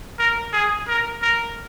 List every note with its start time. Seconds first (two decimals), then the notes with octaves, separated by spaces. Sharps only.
0.19 A#4
0.53 G#4
0.88 A#4
1.22 A#4